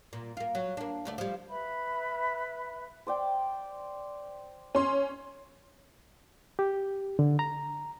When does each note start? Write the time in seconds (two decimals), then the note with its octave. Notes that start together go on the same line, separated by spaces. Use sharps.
0.13 A#2
0.37 A#3 F4
0.55 F#3
0.77 A#3 D4
1.05 D2 A3 D5
1.18 F3 G3
1.48 B4 E5 B5
3.07 C5 D5 G5
4.75 C#4 C6
6.59 G4
7.19 D3
7.39 A#5